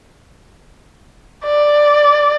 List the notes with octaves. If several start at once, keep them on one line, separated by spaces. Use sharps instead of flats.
D5